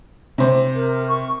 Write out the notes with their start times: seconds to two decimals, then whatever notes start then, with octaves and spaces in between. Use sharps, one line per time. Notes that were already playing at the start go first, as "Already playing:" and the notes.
0.38 C3 C5
0.76 A#4
1.08 C#6